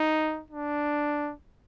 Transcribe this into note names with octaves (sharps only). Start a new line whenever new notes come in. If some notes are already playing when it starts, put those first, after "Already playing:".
Already playing: D#4
D4